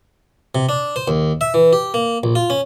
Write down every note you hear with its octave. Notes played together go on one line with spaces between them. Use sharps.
C3
D4
C5
D#2
E5
E3
G4
A#3
A#1
F4
C#4